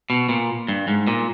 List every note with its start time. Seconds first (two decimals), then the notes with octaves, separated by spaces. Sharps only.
0.10 B2
0.29 A#2
0.68 G2
0.88 G#2
1.07 A#2